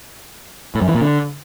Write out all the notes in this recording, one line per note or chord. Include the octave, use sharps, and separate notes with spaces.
A2
F#2
E3
A#2
D3